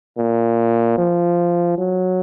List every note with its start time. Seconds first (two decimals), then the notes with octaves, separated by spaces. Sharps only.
0.18 A#2
0.98 F3
1.78 F#3